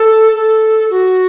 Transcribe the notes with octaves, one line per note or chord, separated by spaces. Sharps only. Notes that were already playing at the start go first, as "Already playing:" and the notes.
Already playing: A4
A4
F#4